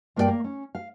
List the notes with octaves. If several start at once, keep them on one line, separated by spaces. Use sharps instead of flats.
G2 A#3 E4 F4 D5 G5
A#3
C#4
F5